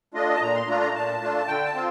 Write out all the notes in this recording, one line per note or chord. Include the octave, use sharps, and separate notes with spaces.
A3 D4 F4 D#5
A5
A#2 A#5
C6
A3 D4 F4 A#5
A#5
A#2 A5
A3 D4 F4
D3 G5
A5
C4 F4